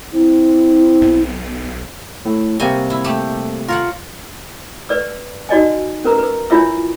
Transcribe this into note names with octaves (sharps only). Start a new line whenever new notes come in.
C4 E4
B1
A2
C3 G3 A#3 C4 F#4 G#5
E4
A3 G4
F4 A#4 C#5 F#5
B4 D5 E6
D#4 F#4 D5 D#5 G#5
C#4 A#4 B4 A#5 E6
B4 E6
D4 E4 F4 C#5 E5 E6